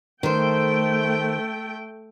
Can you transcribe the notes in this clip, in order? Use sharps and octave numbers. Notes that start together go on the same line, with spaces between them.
D#3 A3 C5 G5